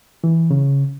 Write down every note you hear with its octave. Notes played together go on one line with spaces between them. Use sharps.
E3
C#3